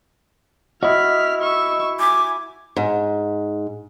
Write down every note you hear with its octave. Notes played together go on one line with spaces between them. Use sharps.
E4 F#4 D#5 F6 B6
C#6 E6
G#5 D6
G#2